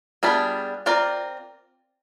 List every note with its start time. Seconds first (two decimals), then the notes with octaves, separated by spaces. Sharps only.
0.23 G3 B3 D4 F4 G#4
0.86 C4 F4 A#4 D5